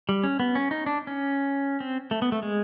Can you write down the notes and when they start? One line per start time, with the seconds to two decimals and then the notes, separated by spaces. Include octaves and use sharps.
0.09 G3
0.24 C#4
0.40 B3
0.55 C#4
0.71 D#4
0.86 D4
1.07 C#4
1.80 C4
2.11 A3
2.22 B3
2.32 A3
2.43 G#3